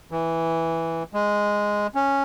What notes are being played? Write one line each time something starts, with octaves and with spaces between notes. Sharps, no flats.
E3
G#3
C#4